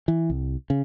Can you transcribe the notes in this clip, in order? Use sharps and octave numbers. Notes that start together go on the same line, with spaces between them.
E3
C2
C#3